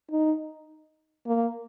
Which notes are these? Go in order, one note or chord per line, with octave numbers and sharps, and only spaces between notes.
D#4
A#3